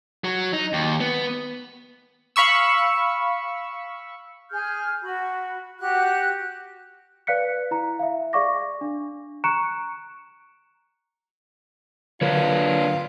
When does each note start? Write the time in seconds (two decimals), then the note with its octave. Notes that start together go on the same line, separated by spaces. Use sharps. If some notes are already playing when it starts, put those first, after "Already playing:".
0.24 F#3
0.53 D#4
0.73 D#2
1.00 B3
2.36 F5 B5 C#6 E6
4.50 G#4 F6 G6
5.02 F#4 B5
5.79 F#4 G4 F#5 F#6
7.27 B4 D5 F5 F#6 B6 C#7
7.71 E4 A#5
7.99 E5 F5
8.33 G#4 D5 F5 C#6 D6 A#6
8.81 D4
9.44 A#5 C#6 F#6 C#7 D7 E7
12.21 D3 F#3 D4 F4 A#4 B4 C#5